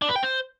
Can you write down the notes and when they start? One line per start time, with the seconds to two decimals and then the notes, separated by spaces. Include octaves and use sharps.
0.02 D4
0.09 B4
0.16 G5
0.23 C5